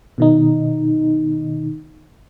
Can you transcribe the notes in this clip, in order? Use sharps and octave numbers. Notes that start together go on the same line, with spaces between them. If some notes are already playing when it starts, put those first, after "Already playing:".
B2 D#3 D#4